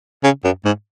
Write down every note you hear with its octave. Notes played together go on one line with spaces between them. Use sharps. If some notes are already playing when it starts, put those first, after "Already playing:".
C#3
F#2
G#2